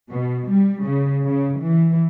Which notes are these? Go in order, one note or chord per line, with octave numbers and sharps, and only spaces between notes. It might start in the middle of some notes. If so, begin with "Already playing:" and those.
B2
G3
C#3
C#3
E3